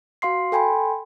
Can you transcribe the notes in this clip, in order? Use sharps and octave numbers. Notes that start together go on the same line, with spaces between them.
F#4 F5 C6 C7
A4 G5 G#5 B5 C6